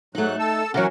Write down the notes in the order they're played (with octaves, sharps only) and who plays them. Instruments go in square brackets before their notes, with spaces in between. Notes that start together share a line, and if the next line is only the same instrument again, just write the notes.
[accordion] G#2 F#3 F#6 [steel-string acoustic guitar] A3 D#4
[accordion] A4 A5 E6
[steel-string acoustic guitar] D3 E3 F#3 [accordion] C#4 A#4 F#5